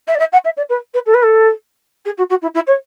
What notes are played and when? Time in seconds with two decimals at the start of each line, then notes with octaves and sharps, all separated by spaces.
0.07 E5
0.15 D5
0.19 E5
0.32 F#5
0.44 E5
0.57 D5
0.69 B4
0.94 B4
1.05 A4
1.14 B4
1.22 A4
2.05 G#4
2.17 F#4
2.29 F#4
2.41 E4
2.54 E4
2.67 C#5